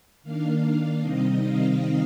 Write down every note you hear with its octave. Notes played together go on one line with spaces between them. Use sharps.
D#3 A#3 D4 F5
C3 D#3 G3 C4 D#4 D#5
F5